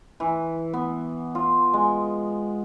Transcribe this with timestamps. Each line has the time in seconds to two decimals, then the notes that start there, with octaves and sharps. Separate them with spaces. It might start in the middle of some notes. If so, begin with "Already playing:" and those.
0.20 E3
0.73 B3
1.35 F4
1.74 G#3